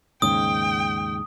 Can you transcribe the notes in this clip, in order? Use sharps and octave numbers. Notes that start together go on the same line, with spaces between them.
D#2 G#2 C#3 G5 D#6